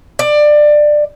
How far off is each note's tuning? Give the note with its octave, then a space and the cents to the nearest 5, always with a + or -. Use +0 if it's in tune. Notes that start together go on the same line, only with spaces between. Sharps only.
D5 +20